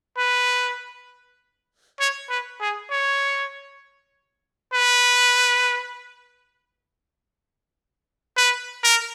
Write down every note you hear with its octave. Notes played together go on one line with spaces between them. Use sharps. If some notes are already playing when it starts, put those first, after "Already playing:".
B4
C#5
B4
G#4
C#5
B4
B4
A#4